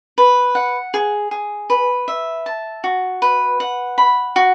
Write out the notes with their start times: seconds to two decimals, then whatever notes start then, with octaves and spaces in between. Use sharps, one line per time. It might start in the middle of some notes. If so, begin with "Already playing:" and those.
0.18 B4
0.55 F#5
0.94 G#4
1.31 G#4
1.70 B4
2.08 E5
2.46 A5
2.84 F#4
3.22 B4
3.60 F#5
3.98 B5
4.36 F#4